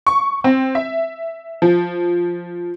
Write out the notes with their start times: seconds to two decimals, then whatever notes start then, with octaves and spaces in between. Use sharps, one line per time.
0.07 C#6
0.44 C4
0.75 E5
1.62 F3